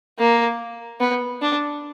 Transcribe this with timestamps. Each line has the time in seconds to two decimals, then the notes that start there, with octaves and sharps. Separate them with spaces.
0.19 A#3
1.00 B3
1.42 D4